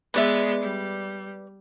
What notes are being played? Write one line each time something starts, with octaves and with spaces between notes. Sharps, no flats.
G#3 B3 B4 D5 E5
G3